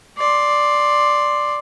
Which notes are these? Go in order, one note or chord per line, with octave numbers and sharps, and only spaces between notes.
D5 C6